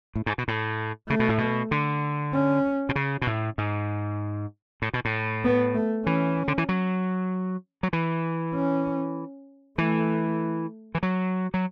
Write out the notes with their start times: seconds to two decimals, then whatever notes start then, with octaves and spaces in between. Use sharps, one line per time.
0.16 A2
0.26 G#2
0.38 B2
0.48 A2
1.09 C#3 A3
1.19 B2
1.29 A2
1.38 B2
1.71 D3
2.33 C#4
2.89 B2
2.96 C#3
3.22 B2
3.27 A2
3.58 G#2
4.82 A2
4.94 B2
5.05 A2
5.44 B3
5.75 A3
6.05 E3 C#4
6.48 D3
6.58 E3
6.69 F#3
7.83 F#3
7.93 E3
8.54 C#4
9.78 E3 A3
10.95 E3
11.03 F#3
11.54 F#3